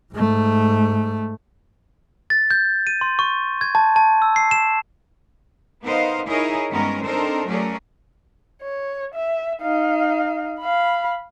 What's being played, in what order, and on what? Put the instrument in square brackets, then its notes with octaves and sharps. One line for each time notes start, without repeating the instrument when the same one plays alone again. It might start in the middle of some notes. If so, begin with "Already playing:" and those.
[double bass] G#2 A3
[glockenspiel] A6
G6
D#7
C6
C#6
G#6
A5
A5
E6
C7
E7
[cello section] B3 D#4 A#4 C5 D#5 F5
D#4 E4 G#4 A#4 C#5 D#5
G2 D#3 G#3 B3 C#4 A#4
C4 D4 D#4 A4 A#4 C5
F#3 A3 C#4 G#4 A#4 D5
[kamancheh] C#5
E5
D#4 F5
F5 B5